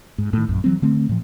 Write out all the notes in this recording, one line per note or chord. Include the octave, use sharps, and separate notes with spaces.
G#2
A2 D#3
A#1 F#2
E3 F#3 C4
D3 A3 C4
A2 F3